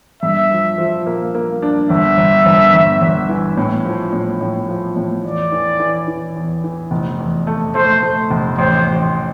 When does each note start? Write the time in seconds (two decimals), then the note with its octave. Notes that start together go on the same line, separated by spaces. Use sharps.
0.23 G2 E5
0.51 F3
0.78 F3
1.06 A#3
1.34 A#3
1.62 D4
1.90 G1 E5
2.18 G1
2.46 G1
2.73 G1
3.02 G1
3.29 E3
3.57 A2
3.85 F3
4.13 A2
4.41 A2
4.68 F3
4.96 A2
5.24 E2 D5
5.52 E3
5.80 E3
6.08 E3
6.35 E2
6.64 E3
6.91 F1
7.19 E2
7.47 A3
7.75 A3 C5
8.03 A3
8.31 F1
8.58 A1 C5
8.87 A1